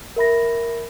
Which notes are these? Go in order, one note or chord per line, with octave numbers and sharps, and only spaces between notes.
A#4 E5 B5 A#6